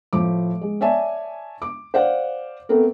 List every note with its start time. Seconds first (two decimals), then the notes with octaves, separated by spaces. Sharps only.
0.13 A2 F3 D6
0.61 G#3
0.81 C#5 D5 E5 G#5 A5
1.62 D6
1.94 C5 D5 F5 F#5
2.69 A3 B3 C4 A#4